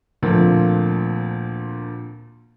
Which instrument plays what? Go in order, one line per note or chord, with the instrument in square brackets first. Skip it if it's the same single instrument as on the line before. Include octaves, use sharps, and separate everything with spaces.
[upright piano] D2 A#2 F3 A3 A#3 C4